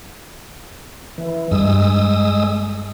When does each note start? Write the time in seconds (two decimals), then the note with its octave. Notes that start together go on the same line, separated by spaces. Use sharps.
1.18 E3
1.51 G2 G#3 D#6 E6